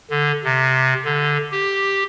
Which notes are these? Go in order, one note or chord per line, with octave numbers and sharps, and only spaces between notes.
D3
C3
D3
G4